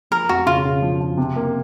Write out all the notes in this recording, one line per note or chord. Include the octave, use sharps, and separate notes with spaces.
F3 A#4
F2 F#4
C#3 F4
C#3
F3
F3
C3
A#3